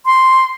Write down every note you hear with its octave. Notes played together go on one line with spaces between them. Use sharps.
C6